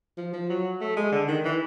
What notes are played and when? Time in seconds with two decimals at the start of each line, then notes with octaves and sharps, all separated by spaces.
0.18 F3
0.33 F3
0.49 F#3
0.81 A3
0.97 G#3
1.12 D3
1.28 D#3
1.45 E3